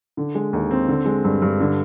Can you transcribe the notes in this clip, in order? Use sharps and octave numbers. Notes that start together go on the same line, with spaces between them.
D3
G#3
D#2
C4
D3
G#3
G2
G2
D3